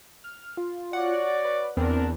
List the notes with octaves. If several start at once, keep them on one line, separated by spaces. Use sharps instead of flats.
F6
F4
F#4 C#5 D5 F#5
B4
E2 C4 D4 A#4